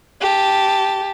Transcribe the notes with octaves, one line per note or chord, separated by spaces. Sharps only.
G4 A5